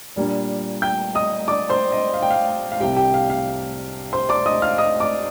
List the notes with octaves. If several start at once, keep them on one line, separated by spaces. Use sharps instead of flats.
A#2 G3 A#3 D4
G5 G6
D#5 D#6
D5 D6
C5 C6
D#5
F5
G5
F5
F5
C2 C3 G3 G4 G5
G4 G5
F5
F5
C5 C6
D5 D6
D#5 D#6
F5 F6
D#5 D#6
D5 D6